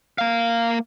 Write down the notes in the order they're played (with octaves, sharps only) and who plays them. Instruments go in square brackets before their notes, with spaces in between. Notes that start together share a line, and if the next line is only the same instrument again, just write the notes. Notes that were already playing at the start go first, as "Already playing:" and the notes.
[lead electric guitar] A#3 F5